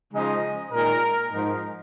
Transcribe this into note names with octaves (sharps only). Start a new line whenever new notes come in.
C#3 F3 G#3 D#4 D#5
A#2 G#3 D#4 A#4
G#2 F3 G#3 D#4 A#4